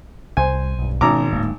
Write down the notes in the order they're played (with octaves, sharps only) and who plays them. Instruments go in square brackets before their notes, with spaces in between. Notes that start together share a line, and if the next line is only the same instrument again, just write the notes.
[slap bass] C2 [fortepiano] C5 G#5
[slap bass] B1 G2
[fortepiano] G#1 A#5 D6 [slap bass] B2 D#3 C#4
[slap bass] D1 G#2 A#3